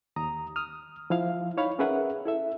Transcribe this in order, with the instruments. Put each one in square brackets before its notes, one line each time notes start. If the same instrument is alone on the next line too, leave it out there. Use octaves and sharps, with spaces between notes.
[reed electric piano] D#2 A#5 D#6
D#6 F6
F3 E4 F5
D#4 C#5 F5 B5
C#4 G#4 A#4 B4 E5 F#5
E4 A4 E5